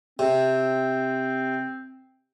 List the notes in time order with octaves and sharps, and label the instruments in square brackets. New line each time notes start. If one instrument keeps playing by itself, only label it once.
[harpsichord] C3 [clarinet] C4